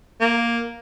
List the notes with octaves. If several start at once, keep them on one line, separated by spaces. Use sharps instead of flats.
A#3